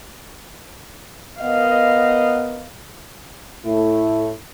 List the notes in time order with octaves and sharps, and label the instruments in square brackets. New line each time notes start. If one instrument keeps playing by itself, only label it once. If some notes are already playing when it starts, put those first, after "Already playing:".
[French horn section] B3 A#4 D#5 [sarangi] F5
[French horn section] A2 A3 E4